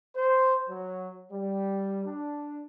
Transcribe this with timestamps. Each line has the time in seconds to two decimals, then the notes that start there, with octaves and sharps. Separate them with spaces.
0.15 C5
0.69 F#3
1.32 G3
2.05 D4